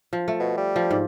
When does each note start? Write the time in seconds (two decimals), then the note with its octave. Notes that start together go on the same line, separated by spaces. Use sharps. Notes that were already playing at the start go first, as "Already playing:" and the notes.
0.13 F3
0.28 A3
0.40 B2
0.57 G3
0.76 F3
0.91 G#2